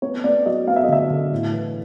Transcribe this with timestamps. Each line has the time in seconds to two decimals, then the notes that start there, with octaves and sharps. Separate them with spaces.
0.02 B3 C#5
0.24 B3 D5
0.46 F#3 D#5
0.67 B3 F5
0.76 E5
0.84 D#5
0.88 D3 E5
1.10 D3
1.32 A2
1.53 E3